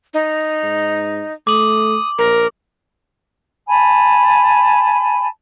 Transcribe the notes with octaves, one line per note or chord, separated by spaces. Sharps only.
D#4
G#2
A3 D6 D#6 F#7
A#1 A#4
G#5 A5 B5